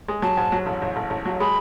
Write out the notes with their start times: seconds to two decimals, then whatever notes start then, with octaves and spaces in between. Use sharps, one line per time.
0.08 G#3
0.22 F#3 A5
0.37 G#2
0.52 F#3
0.66 A1
0.82 A1
0.96 A1
1.10 A1
1.25 F#3
1.40 G#3 B5